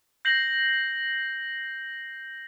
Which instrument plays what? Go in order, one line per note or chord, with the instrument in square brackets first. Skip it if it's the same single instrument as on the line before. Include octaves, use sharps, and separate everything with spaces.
[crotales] G6 A#6 C7 F#7